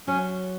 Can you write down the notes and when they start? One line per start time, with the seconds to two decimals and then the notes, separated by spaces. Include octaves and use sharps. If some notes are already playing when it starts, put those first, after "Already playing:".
0.07 F#3 C#4